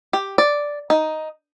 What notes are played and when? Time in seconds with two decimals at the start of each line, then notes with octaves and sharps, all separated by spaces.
0.13 G4
0.38 D5
0.90 D#4